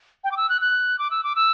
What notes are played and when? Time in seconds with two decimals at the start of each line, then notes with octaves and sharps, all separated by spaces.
0.24 G5
0.32 D6
0.37 E6
0.49 F#6
0.61 F#6
0.99 D6
1.11 E6
1.24 D6
1.36 E6